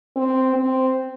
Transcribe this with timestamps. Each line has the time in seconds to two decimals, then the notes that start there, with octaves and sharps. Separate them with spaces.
0.16 C4
0.56 C4